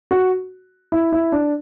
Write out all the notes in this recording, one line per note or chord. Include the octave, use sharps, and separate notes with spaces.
F#4
E4
E4
D4